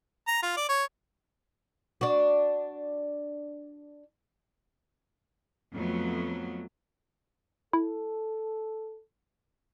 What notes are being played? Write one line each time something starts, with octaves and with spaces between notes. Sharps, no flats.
A#5
F4
D5
C#5
D4 F#4
F2 F#3 A3 B3
E4 A4